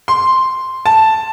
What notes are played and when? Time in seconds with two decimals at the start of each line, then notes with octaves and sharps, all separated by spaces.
0.08 C6
0.86 A5